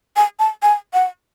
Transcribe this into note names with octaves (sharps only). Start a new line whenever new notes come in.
G#5
A5
G#5
F#5